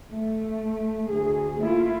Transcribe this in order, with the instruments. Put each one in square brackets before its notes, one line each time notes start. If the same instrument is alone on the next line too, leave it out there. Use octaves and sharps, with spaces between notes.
[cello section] A3
D2 G#4
A3 A#3 E4 F4